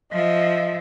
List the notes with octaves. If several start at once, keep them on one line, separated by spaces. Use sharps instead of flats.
F3 D#5 E5